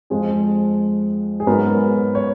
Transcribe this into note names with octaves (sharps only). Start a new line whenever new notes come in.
F2 F3 G#3 G#4
G#4
G#2 F#3 B3 A#4
C#5